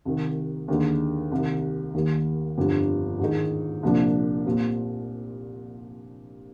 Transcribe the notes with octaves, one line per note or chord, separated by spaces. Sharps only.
C2 C3 D#3
D#2 D3 G#3 D#4
C2 C3 D#3
D#2 D#3 G3
G1 F2 D3 G3
G#2 D#3 G#3 D#4 G#4
C2 A#2 F3 A#3 D4
A#2 G3 C4